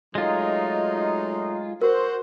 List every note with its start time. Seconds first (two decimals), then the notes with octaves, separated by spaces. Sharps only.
0.15 F#3 G#3 A3 D#4 F4
1.81 F#4 A#4 C5